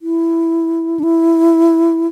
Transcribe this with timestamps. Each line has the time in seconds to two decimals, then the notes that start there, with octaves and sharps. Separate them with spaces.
0.02 E4
0.99 D4
1.03 E4